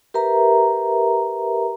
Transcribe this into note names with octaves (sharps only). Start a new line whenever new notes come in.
G4 A#4 B4 E5 A#5